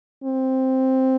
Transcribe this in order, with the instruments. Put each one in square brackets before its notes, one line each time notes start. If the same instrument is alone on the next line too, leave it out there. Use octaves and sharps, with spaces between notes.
[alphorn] C4